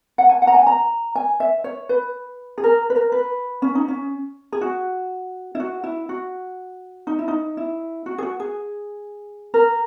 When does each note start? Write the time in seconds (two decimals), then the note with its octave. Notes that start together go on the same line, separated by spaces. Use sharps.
0.18 F#5
0.29 G#5
0.42 F#5
0.47 A#5
0.54 G#5
0.67 A#5
1.15 G#5
1.40 E5
1.64 C#5
1.89 B4
2.58 G#4
2.64 A#4
2.90 B4
2.96 A#4
3.12 B4
3.62 C#4
3.75 D#4
3.88 C#4
4.53 G#4
4.61 F#4
5.55 E4
5.60 F#4
5.84 E4
6.09 F#4
7.07 D#4
7.19 E4
7.28 D#4
7.57 E4
8.06 F#4
8.18 G#4
8.22 F#4
8.40 G#4
9.54 A#4